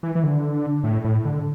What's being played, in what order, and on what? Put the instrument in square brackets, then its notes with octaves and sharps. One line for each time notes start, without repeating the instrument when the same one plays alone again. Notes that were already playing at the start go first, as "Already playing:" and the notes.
[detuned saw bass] E3
E3
D3
A2
A2
D3